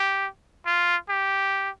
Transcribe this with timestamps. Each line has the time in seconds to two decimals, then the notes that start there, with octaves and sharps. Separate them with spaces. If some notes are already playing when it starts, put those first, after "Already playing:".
Already playing: G4
0.66 F4
1.09 G4